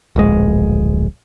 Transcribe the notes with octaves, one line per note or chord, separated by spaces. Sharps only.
D1 A#1 G#3